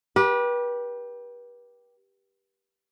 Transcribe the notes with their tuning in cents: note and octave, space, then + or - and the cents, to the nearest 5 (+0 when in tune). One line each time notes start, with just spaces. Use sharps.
G4 +0 B4 -35